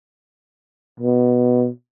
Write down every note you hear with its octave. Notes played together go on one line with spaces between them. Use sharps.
B2